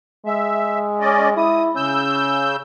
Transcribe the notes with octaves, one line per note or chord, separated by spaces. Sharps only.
G#3 E5
C#4 D5 D#5
E4 D#6
C#3 C#4 E6 G6